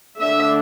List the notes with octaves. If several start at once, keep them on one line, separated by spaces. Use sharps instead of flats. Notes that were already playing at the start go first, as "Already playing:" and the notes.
D3 A3 D4 E5